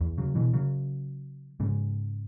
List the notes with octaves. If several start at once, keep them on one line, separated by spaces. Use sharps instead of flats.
E2
C#3 F#3
B2 E3
C#3 F#3
G#2 C#3